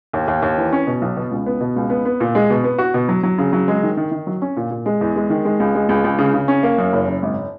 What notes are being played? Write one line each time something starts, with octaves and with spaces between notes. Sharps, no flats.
D#2
D#2
D#2
E3
C#4
B2
B1
B2
C#2
B3
B2
C#2
B3
B3
A#2
G#3
B2
B3
F#4
B2
F#3
F#3
C#3
F#3
G#3
D#3
D#3
D#3
F#3
C#4
A#2
A#2
G#3
E2
G#3
D#3
G#3
C#2
G#3
C#2
C#2
C#3
C#3
C#4
A#3
F#2
F#1
F#1
G#1